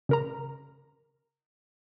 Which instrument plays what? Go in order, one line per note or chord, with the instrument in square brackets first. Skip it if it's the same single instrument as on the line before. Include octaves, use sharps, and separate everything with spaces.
[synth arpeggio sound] C#3 A#4 A#5